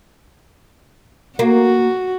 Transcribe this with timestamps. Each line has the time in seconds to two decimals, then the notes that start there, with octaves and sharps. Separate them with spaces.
1.39 A#3 F#4